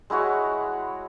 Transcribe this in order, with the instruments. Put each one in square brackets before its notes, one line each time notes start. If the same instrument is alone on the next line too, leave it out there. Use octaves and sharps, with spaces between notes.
[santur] G#3 E4 F#4 C#5